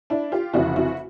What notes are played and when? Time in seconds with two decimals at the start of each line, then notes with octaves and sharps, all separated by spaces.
0.10 D4 E4
0.32 F4 G4
0.54 F1 F2 C#3 E3 E4 F#4
0.76 E4 F#4